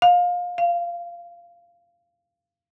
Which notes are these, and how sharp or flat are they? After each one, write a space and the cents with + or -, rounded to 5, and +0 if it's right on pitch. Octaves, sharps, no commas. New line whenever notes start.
F5 +25
F5 -15